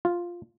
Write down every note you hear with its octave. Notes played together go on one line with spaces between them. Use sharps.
F4